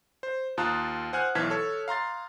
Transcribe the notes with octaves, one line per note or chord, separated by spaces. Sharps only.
C5
D#2 F4 A5 A#5 D#6 F#6
C5 F#5 G#5 F6 F#6
B1 E3 A5 F6 G#6 B6
A4 C#5
F5 A#5 C6 A6